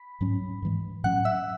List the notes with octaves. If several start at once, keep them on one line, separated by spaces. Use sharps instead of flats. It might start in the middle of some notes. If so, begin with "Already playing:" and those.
Already playing: B5 B6
G#2 F#3 C#4
G#2 E3 G#3
A2 F#3 C#4 F#5 F#6
E5 E6